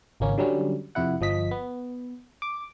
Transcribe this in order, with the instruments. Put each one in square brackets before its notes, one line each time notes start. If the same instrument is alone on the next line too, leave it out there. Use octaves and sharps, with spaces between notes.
[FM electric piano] G#1 C#2 A#3 C#4
D3 F#3 G3 C#4
F2 C3 E4 F#5
G1 F3 D#5 B6
B3
D6